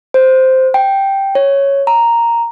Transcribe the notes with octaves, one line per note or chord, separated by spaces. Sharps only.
C5
G5
C#5
A#5